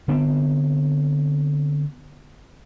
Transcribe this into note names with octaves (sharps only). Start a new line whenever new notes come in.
D3 B3 C4